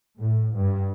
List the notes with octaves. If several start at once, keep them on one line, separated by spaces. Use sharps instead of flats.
A2
G2